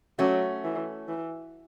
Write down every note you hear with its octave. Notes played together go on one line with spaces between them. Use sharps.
F#3 A3 C#4
E3
E3